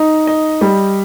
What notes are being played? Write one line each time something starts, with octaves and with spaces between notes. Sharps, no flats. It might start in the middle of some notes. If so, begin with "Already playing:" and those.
Already playing: D#4
D#5
G3